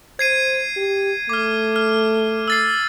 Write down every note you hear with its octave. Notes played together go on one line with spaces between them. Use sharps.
C5 G#6 C7 D#7
G4
A3 D6 F6
F6
E6 A6 C7